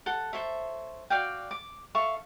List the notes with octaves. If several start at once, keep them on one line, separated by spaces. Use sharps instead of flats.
A4 F#5
A4 C5 C#5 E5
F#4 D5 F5 G5
D6
A4 E5 F5 C#6